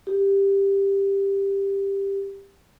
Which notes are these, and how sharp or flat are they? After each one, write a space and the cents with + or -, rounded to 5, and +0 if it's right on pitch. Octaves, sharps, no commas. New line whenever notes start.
G4 +10